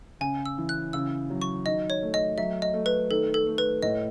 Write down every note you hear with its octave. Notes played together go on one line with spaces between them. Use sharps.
C#3 G#5
E6
E3
F#6
C#3 E6
F#3
C#6
D#3 D#5
C#5
A3
D#5
F#3 E5
D#5
A3
B4
D#3 A4
A4
A3
B4
A2 D#5